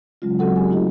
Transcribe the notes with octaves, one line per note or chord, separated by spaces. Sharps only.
C#3 F#3 G#3 C#4 F4
F#3 C4 F#4 A4 F#5
C#4 G4 G#5
A3 D#4 F4 G4 D#5